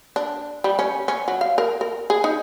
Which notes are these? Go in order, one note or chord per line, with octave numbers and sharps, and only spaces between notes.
D4
G3
C#4
C#4
F#3
F5
A#4
A#4
G#4
D#4